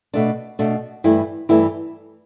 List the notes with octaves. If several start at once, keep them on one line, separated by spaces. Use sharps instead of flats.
B2 A3 D4
B2 A3 D4
G2 E3 A3 E4
G2 E3 A3 E4